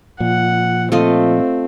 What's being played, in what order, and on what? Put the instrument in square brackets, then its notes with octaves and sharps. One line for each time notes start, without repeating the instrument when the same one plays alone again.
[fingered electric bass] A#2 [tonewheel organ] F3 [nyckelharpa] F#5
[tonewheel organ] F3 [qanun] A3 F4 D#5 [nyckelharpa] C4